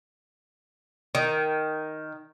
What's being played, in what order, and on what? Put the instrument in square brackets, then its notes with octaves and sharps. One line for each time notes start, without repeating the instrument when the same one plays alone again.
[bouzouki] D#3